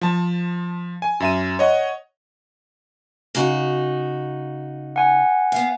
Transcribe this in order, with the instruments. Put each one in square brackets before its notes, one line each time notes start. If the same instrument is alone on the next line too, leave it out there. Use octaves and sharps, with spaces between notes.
[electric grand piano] F3 A5
G#5
F#2 E5 D#7
C#5 D#5 F#5
[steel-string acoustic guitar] C#3 D#4 F#4
[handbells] F#5 G#5
[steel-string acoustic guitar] B3 F5